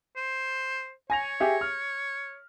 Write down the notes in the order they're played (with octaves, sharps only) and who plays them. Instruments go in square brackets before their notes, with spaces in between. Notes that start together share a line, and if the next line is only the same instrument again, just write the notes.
[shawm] C5
[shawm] C#5 [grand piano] G#5 A#6 F7
[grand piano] G4 G#4 E5
F6